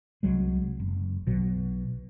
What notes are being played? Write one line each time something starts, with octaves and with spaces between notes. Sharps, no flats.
C2 F#3 G#3
F#1
B1 B2 F#3